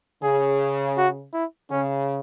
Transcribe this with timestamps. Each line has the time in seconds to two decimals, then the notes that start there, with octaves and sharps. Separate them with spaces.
0.23 C#3 G#4
0.97 F#4
1.33 E4
1.71 C#3 C#4